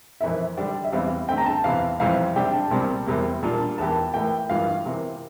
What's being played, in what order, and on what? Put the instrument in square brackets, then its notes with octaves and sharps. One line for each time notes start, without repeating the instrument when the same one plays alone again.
[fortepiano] F2 E3 A#3 E4 [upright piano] E5
[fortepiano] D3 G3 D4 G4
[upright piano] E5
[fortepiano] E2 E3 G3 C4 [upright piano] F5
[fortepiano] D3 A3 C4 [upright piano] G5
[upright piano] A#5
A5
[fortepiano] E2 C3 E3 [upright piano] F5
[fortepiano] F2 C3 E3 G3 [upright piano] F5
[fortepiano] C3 G3 D4 G4 [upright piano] G5
[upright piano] A5
[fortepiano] C2 A#2 G3 C4
E2 C3 G3 A#3
[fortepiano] A#2 G3 D4 F4 [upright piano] A5
[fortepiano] E2 E3 A#3 E4 G4 [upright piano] A5
[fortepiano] A2 E3 A#3 [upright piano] G5
[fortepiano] G2 E3 A#3 F4 [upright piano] F5
[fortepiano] C3 E3 A#3